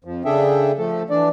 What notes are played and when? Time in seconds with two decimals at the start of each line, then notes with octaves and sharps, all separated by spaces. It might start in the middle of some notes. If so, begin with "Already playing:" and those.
0.04 F2 F3
0.25 C#3 D4 G#4 A4 E5 G5
0.78 F3 A3 A4
1.10 E3 D4 D5